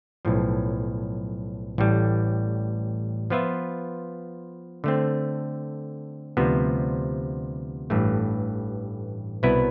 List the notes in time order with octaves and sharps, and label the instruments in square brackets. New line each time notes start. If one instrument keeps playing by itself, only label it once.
[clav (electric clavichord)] B1 A2 F3
A1 A2 G3
F3 B3 F4 B4 E5
D3 A3 C4
D2 C3 F3 B3
A1 G2 E3 A3
C2 B2 B3 E4 B4